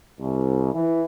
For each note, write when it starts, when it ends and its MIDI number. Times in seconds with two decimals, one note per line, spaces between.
0.19 0.72 36
0.72 1.01 52